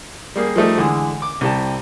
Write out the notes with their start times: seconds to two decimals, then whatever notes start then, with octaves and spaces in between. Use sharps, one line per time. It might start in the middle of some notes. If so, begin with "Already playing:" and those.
0.36 G3 A#3 G#4
0.56 F3 G3 A3 D#4
0.78 D3 E3 G#3 D#6
1.22 D6
1.41 C2 G4 A5